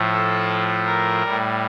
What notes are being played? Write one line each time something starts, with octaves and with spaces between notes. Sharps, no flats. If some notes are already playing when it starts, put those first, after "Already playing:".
Already playing: A2 F3 A3
A4
A#4
A2 G3